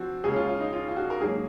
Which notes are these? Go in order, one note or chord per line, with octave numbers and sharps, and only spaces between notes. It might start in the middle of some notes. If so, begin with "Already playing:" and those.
Already playing: F3 C4 F#4
D#2 C#3 G#3 C#4 G#4
F4
F4
D#4
F4
F4
F#4
A#4
G#2 F#3 A#3 G#4